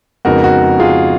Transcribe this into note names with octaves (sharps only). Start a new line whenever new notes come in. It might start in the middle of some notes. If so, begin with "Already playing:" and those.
F2 C#3 G#3 B3 D#4 F#4 A#4
F#4
F4 G#4